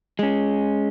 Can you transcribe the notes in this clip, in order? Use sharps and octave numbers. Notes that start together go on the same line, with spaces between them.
G#3 C#4